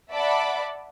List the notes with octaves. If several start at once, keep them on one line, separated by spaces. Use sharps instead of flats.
D5 E5 F#5 A5 B5 D6